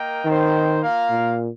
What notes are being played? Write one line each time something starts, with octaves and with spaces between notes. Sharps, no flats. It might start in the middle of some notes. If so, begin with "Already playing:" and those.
Already playing: A#3 A#4 D#5 G5
D#3 C4 D#4 C5
A#3 F4 A#4 F5
A#2